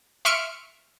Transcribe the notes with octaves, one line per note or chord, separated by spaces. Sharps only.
E5 C6 C#6 F6 C#7 D7